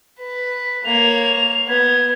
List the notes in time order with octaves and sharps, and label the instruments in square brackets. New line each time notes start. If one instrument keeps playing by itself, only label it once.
[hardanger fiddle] B4
[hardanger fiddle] A#3 C#5 [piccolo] F7
[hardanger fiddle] B3 [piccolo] G#6